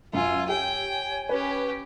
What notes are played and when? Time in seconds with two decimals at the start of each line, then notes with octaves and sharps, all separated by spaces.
0.13 F#2 F4 F#5 G#5 E6
0.49 G4 C#5 G5 G#5
1.29 C#4 G4 B4